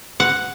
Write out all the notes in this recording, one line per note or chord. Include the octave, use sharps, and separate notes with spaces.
F#5